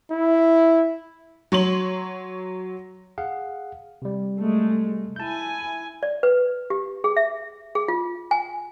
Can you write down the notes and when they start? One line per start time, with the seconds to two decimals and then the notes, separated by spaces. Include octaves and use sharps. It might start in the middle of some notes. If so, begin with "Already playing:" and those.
0.11 E4
1.52 F#3 C#5 C6 F#7
3.18 G#4 F5 F#5
4.02 C3 G3
4.40 G#3 A3
5.16 E4 G#5 A5 G6
6.03 D5
6.23 B4
6.70 G4
7.04 G#4
7.17 E5
7.75 G#4
7.88 F4
8.31 G#5